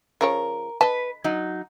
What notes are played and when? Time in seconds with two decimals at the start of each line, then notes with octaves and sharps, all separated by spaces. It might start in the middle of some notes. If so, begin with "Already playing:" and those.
0.21 C#3 F3 A#4 C#5
0.81 B4 D#5 A5
1.24 F#3 D#4